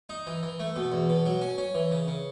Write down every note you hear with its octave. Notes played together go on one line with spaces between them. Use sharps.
D#4
E3
E3
A3
B2
E2
B2
F#3
C#4
C#4
E3
C#3
C#3